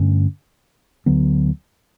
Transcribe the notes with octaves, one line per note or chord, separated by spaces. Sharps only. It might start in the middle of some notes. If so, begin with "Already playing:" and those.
Already playing: G2 D3 A3 C#4
D2 D3 F#3 B3